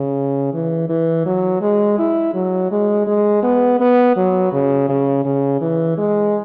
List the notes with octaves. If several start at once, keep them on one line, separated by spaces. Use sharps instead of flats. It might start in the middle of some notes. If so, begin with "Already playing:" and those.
Already playing: C#3
E3
E3
F#3
G#3
E4
F#3
G#3
G#3
B3
B3
F#3
C#3
C#3
C#3
E3
G#3